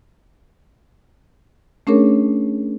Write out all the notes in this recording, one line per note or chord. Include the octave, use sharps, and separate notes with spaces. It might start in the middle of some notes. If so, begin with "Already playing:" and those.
A3 C#4 D4 G#4 A#4 C#5